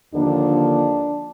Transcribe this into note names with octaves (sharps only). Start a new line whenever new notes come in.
D#2 D3 F3 A#3 D4